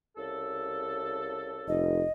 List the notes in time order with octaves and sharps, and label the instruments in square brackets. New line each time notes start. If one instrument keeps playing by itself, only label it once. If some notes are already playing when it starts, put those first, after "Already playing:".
[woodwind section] C2 C#3 A4
[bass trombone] F1 [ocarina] D#5